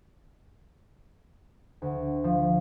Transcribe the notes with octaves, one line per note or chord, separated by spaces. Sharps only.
D2
F3